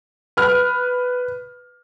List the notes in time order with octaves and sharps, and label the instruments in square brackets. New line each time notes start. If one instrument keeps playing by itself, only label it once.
[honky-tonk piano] B4 F6